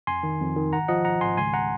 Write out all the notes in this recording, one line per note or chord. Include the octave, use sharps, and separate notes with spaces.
F2 G#5 C6
D#3
F2
D#3
G#1 F#5 A#5
F3 D#5 F#5
G#1 F#5 A#5
G#1 G#5 C6
C#2 G#5 C6
F#5 A#5